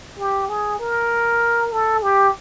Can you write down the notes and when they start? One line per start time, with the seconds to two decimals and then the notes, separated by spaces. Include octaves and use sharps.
0.19 G4
0.49 G#4
0.80 A#4
1.72 A4
2.02 G4